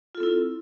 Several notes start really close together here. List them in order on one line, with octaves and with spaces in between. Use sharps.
F4 A4 C4 E4